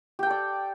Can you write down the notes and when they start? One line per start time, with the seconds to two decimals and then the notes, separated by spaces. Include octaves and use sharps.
0.19 G4
0.23 G5
0.27 A4
0.30 D5